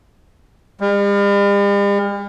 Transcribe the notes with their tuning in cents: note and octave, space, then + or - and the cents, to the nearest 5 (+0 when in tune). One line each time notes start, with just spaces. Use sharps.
G3 +45